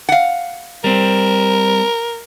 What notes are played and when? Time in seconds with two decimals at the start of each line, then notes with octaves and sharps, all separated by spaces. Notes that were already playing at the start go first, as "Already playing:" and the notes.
0.09 F5 F#5
0.84 G3 C4 A#4